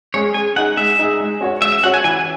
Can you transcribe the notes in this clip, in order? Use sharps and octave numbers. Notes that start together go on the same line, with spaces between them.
G#3 C#4 G#4 C#5
G#3 G#5
D#4 G#4 F#5
G#3 E5
D#4 G#4
G#3
C#4 F#4 C#5
G#3 E5
E5
C#4 F#4 C#5 F#5
G#5
E3 G#5